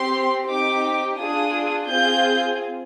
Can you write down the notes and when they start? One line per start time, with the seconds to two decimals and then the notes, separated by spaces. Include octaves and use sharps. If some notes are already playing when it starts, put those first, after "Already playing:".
Already playing: C4 G4 C6
0.47 C4 D#4 G4 D6
1.18 D4 F4 G#4 D#6
1.89 C4 F4 G#4 G6